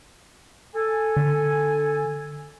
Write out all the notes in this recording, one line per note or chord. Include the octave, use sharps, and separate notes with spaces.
A4 G#5
D3